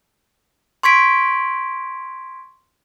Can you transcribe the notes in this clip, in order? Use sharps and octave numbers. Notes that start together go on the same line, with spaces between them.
C6 C#6 G#6 B6 D7